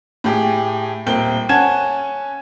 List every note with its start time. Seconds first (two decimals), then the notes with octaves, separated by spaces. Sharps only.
0.24 A2 G4 G#4
1.06 D#1 A#3 C4 G5 G7
1.49 C#4 F#5 G#5 A5 G#6 E7